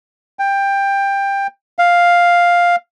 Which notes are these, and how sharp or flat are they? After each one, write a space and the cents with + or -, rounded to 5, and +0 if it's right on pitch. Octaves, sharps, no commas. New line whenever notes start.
G5 +15
F5 +5